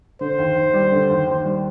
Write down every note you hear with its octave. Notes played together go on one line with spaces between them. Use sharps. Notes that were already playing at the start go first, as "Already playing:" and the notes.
D3 C5
D#2
D#2
G3
D3
D#2
D#2
G3